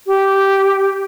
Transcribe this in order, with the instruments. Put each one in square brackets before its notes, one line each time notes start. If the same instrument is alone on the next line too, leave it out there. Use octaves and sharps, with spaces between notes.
[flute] G4